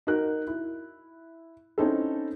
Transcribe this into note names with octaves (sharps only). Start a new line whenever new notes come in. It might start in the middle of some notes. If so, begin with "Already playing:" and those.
D#4 F#4 A#4 F#6
E4
C4 C#4 D#4 E4 A4